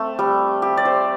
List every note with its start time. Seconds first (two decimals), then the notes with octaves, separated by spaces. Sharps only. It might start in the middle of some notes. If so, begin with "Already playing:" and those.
Already playing: A3 C4
0.19 G3
0.62 G4
0.77 D5
0.85 C5